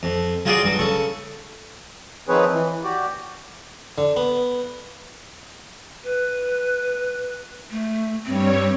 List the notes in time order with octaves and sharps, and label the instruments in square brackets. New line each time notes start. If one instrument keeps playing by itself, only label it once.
[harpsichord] F2
F#3 F4 F#4 G#4 D5
G2 F#3
C#3 A4 C#6
[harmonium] D#3 F3 C4 G#4 B4 C#5
E3
F#4 G4 D5
[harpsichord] D3
B3
[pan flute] B4
A3
[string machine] G2 G3 C#5 [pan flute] C4